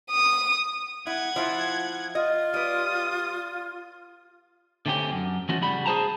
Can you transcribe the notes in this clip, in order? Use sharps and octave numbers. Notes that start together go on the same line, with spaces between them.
D#6
E4 F#5 G#6
F3 E4 F4
F4 D#5
G3 B4 D#6
D3 A3 C4 C#4 G4
F#2
E3 F3 A3 C#4 F#4
C#3 G3 F#4 B5
G#4 A4 C5 A5 A#5